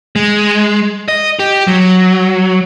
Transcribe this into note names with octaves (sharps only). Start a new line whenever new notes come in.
G#3
D#5
G4
F#3